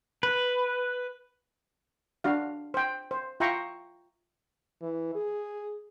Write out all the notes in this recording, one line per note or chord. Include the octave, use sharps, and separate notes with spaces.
B4
D4 F#4 F5
C5 G5
C5
F4 E5 G5 A#5 C6 C#6
E3
G#4